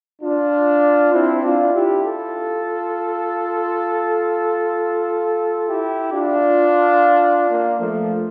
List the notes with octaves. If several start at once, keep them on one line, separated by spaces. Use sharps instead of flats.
D4 F4
C4 E4
D4 F4
E4 G4
F4 A4
E4 G4
D4 F4
A#3 D4
F3 A3